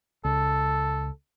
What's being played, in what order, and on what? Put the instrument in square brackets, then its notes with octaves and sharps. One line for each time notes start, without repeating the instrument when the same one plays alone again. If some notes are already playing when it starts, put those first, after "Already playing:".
[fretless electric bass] C#2 [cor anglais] A4